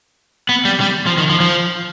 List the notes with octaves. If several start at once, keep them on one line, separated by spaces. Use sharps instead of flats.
B3
G3
G3
F3
D#3
F3
F3